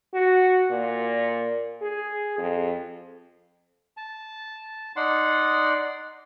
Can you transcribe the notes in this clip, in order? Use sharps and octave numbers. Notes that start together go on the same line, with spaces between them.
F#4
A#2
G#4
F2
A5
D#4 D5 F#5 C6